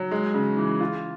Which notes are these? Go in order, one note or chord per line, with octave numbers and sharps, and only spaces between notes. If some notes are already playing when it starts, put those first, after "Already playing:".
Already playing: F#3
G#3
C#3
E3
F4